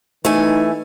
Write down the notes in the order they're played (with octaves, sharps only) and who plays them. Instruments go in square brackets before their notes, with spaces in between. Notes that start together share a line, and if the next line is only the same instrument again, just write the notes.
[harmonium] E3 [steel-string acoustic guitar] A3 G#5 [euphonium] D#4